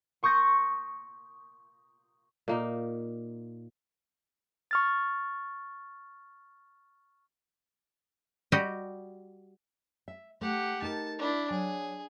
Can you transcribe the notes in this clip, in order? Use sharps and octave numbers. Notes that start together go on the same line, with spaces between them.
C6 C#6 D#6 G6 A#6 C#7
A#2 A#3 D#4
C#6 F6 A6
G3 F#4 G4 D#5 F#5
E5
A3 G4 F#5
D#4 A4 A#4 A5
D4 E4
F#3 G#4